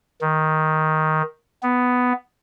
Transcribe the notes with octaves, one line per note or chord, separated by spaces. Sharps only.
D#3
B3